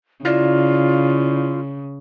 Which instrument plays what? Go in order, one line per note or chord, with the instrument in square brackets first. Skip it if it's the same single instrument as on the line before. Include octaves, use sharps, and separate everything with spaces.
[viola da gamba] C#3 [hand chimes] E4 D5 [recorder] F4